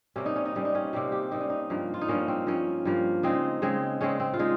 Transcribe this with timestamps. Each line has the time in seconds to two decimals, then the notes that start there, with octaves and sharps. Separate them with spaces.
0.16 C3 G3 A#3 C#4
0.26 D#4
0.36 C#4
0.46 D#4
0.55 C3 G3 A#3 C#4
0.65 D#4
0.75 C#4
0.93 C3 G3 A#3 G4
1.12 G4
1.31 C3 G3 A#3 D#4
1.41 C#4
1.50 D#4
1.70 G2 F3 A#3
1.94 F4
2.01 D#4
2.08 G2 F3 A#3 C#4
2.28 C4
2.47 G2 F3 A#3 C#4
2.85 G2 F3 A#3
3.23 C#3 G#3 C4 D#4
3.62 C#3 G#3 C4
4.01 C#3 G#3 C4 C#4
4.20 C4
4.34 F4
4.39 C#3 G#3 C4 D#4